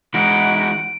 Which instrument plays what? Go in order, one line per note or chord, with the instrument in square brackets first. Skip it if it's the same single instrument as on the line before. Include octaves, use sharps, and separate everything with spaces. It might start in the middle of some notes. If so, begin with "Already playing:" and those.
[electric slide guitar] E3 G#3 [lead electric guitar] D#4 E4 [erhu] F#5 [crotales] D7